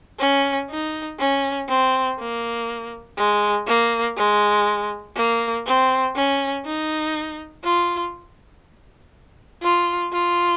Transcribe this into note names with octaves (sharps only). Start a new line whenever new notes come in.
C#4
D#4
C#4
C4
A#3
G#3
A#3
G#3
A#3
C4
C#4
D#4
F4
F4
F4